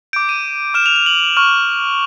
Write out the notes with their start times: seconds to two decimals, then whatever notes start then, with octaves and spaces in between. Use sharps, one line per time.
0.13 D6 G6 D7
0.29 D#7
0.74 D6 F6 E7
0.86 F7
0.96 F7
1.06 F#7
1.37 C#6 F6